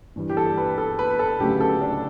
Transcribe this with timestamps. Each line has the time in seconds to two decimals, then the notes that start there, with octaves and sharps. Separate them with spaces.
0.16 G2 E3 G3
0.30 G4
0.37 A4
0.58 B4
0.78 A4
0.99 B4
1.19 A4
1.40 D2 C#3 F#3 A3 G4
1.61 A4
1.82 D4